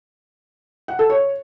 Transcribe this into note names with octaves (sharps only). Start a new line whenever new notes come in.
F#5
A4
C#5